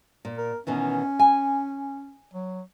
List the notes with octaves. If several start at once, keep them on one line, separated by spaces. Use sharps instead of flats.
A#2
A#4
B2 D#3 E3 C#4
G#5
F#3